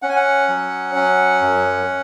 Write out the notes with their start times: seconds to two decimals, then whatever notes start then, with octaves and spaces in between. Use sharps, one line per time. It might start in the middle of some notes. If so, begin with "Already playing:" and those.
0.02 C#4 F#5
0.09 G#5
0.16 F#5
0.49 F#3
0.95 C#4
1.41 F#2